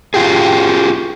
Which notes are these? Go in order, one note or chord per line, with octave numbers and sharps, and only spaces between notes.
F4 G4 G#4